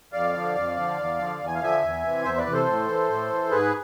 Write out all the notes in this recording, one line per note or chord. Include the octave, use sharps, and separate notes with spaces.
F2 D5 F5
D3 F3
F2
D3 F3
E2
D3 F3
E2
G#5
F5
D3 F3 E5 G#5
E2
C3 E3
E2 C5 E5
B4 D5
C3 E3
A4 C5
A2
E3
A2
E3
G#2 G#4 B4